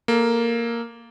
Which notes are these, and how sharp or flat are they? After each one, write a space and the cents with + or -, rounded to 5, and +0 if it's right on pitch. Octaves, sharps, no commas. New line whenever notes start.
A#3 +0 A4 -10